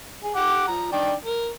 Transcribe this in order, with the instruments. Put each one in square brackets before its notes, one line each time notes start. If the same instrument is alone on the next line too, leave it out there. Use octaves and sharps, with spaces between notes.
[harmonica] G#4
G4 F#5 D6
F3 A#5
D#3 D4 G5
A#4